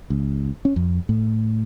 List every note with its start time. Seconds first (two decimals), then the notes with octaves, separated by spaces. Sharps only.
0.10 C#2
0.65 C#4
0.76 F2
1.09 A2